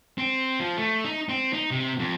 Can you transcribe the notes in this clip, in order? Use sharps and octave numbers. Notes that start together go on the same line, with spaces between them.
C4
F3
A3
D#4
C4
D#4
C3
F2